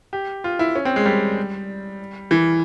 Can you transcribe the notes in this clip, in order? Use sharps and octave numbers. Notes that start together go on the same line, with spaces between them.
G4
F4
E4
C#4
C4
G#3
G3
E3